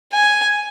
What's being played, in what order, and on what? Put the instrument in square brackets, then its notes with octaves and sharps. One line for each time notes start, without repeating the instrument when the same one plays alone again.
[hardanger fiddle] G#5